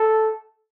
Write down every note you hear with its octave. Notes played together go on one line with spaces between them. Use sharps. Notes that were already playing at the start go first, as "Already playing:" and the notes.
Already playing: A4